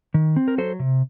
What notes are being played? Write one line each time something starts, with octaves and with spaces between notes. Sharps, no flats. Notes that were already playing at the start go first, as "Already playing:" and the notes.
D#3
C4
A#4
F#3 A4 C5
C3